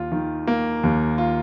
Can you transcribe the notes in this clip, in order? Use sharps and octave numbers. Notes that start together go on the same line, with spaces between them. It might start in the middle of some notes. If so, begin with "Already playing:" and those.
Already playing: D#2 F4
D#3
A#3
D#2
F4